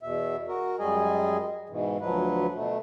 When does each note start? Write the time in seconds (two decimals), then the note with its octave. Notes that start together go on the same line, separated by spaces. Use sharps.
0.03 E2 B2 E5
0.48 F#4 A#4
0.79 F#2 G3 G#3 G#4 D#5 G#5
1.69 G#2 B2 E3
2.01 D2 F3 F#3 B4
2.54 B2 A3